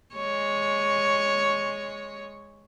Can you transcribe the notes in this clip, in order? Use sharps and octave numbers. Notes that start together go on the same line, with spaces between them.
G#3 C#5